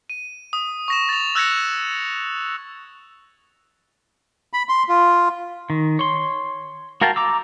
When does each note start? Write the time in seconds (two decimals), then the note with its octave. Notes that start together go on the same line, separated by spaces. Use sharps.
0.10 D#7
0.53 D#6
0.88 C#6 A#6 E7
1.09 A6 F7
1.35 E6 F#6 G#6 A#6 C#7
4.53 B5
4.69 C6
4.89 F4
5.70 D#3
5.99 C#5 C6
7.01 F#4 A#4 F5 G5 A5
7.16 A#5 D6 E6